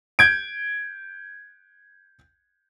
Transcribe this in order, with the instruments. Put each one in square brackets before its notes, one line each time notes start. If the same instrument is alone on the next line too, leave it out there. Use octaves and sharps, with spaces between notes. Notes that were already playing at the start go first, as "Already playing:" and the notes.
[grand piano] G6 G#6 D7